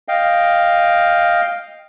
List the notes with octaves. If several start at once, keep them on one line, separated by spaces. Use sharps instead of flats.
D#5 F5 G5